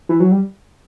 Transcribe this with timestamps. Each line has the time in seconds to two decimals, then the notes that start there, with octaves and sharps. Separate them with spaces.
0.09 E3
0.20 F#3
0.31 G3